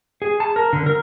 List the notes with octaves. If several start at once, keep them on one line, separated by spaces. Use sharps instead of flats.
G#4
A5
A#4
D3
A#4